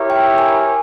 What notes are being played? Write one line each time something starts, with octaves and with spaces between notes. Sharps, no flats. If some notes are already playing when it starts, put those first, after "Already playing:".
Already playing: E4 G4 A#4 C#5 E5
G5
G#5